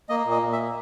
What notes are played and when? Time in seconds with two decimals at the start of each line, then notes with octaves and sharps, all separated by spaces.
0.09 A#3 D#5
0.26 A#2
0.31 D#5
0.43 A#2
0.52 E5
0.58 A#3